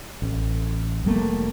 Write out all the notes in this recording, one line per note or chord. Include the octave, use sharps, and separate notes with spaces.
A1
F1 G3 A3 A#3